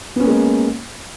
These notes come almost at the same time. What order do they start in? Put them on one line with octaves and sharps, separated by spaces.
B3 C#4 A#3 G#3